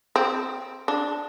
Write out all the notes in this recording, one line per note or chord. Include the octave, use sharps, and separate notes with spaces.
C4
D4